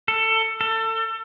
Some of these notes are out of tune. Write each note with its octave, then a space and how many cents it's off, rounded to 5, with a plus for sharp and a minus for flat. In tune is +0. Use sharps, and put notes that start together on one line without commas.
A4 +20
A4 +30